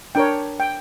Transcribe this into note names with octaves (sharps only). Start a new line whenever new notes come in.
D4 A#4 C#5 G5
G5